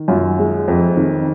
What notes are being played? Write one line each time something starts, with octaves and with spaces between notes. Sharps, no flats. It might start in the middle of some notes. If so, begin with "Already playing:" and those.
Already playing: D#3
F#2 F4
G#3
F2
D#3